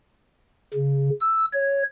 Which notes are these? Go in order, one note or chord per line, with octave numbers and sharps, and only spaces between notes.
C#3
E6
C#5